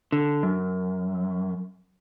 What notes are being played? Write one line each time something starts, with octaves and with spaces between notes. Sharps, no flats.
D3
F#2